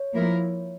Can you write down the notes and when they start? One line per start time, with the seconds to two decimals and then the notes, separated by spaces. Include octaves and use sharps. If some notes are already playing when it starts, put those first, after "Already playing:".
Already playing: C#5
0.14 F3 A#3 E4 A#4